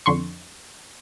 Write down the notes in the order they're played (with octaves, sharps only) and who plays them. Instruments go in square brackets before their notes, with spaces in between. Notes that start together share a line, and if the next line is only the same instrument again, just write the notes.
[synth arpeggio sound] F2 D3 C6 C#6